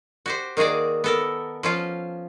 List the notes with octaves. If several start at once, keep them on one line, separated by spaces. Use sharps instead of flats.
F#4 G4 C5
D#3 A#3 F#4 G#4 D5
B3 A4 A#4
F3 C#4 F4